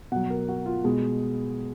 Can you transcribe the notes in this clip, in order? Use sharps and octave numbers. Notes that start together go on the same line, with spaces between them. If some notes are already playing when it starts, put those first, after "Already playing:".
B2 F#3 F#5
A#4
F#4
F4
B2 G#3